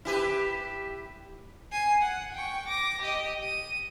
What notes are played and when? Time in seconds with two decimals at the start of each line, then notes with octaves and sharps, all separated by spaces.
0.05 E4 G4 B4
1.72 G#5 C7
2.02 F#5
2.33 G5 C#6
2.67 D6 A#6
3.01 G4 D#5
3.43 D#7